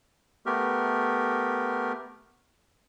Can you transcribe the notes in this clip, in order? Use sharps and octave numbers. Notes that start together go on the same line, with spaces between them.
A3 B3 G4 A#4